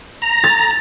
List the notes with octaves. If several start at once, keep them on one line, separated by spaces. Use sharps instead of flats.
A#5
A6